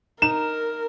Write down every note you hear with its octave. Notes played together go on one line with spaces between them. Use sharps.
D#4 A#4 E7